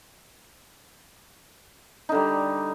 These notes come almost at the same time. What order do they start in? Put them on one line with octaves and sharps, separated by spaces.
D#4 D3 G3